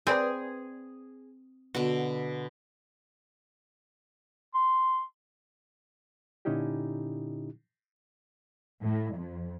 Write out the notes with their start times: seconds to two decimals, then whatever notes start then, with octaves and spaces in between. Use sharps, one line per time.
0.07 C4 G#4 B4 D5 G#5
1.75 B2 D3 F#4
4.55 C6
6.45 A#2 D3 C#4 D#4 E4 G4
8.82 A2
9.15 F2